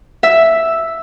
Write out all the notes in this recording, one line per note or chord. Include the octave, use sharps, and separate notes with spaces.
E5